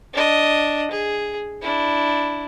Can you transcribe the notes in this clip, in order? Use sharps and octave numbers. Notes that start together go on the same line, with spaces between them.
D4 D#5
G#4
D4 E4